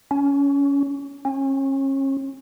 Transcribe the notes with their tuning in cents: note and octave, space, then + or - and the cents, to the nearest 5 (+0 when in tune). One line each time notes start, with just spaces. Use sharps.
C#4 +20
C#4 -35